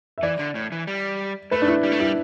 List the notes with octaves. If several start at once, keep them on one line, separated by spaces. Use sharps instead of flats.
E5
E3 D5
D3
A2
E3
G3
A3 B4
D4
E4
G3
A3
G3 E4